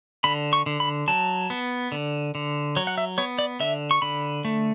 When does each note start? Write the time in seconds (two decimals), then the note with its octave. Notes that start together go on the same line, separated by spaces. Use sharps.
0.24 D3 B5
0.53 C#6
0.66 D3
0.80 B5
1.08 F#3 A5
1.50 B3
1.92 D3
2.35 D3
2.76 F#3 C#5
2.87 F#5
2.98 E5
3.18 B3 C#5
3.39 D5
3.60 D3 E5
3.91 C#6
4.02 D3 B5
4.45 A3